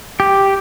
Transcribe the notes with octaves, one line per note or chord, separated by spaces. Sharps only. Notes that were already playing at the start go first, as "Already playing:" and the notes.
G4